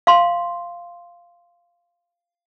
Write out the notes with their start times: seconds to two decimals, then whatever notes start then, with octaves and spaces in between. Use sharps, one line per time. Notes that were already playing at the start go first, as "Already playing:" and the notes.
0.07 F5 C6